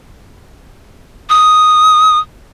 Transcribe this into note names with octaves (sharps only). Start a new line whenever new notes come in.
D#6